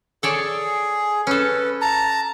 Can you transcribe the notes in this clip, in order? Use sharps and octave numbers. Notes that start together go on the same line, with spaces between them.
G#4 A4 C#5 D5
C#4 A4 B4
A5 A#5